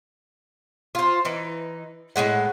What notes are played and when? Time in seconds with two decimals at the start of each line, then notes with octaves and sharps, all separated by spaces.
0.95 F4 C5
1.25 E3 D#4
2.16 A2 G3 G#3 F#5